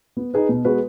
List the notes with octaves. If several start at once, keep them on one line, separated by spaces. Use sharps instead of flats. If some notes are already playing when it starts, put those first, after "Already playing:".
B3
D#4 G#4 B4
B2
G#3 B3 F#4 B4